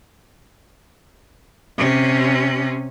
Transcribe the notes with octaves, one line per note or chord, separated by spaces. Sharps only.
C3 C#4